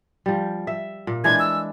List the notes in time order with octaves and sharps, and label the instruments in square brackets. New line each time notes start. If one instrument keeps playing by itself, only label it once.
[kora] F3 G3
E5
A#2
[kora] E3 G#3 D4 [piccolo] G#6
[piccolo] E6